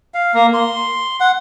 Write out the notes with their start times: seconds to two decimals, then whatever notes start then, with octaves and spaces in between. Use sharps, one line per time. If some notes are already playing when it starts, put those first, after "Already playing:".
0.14 F5
0.34 A#3
0.54 C6
1.20 F#5